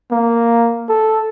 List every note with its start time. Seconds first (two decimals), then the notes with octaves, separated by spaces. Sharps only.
0.11 A#3
0.89 A4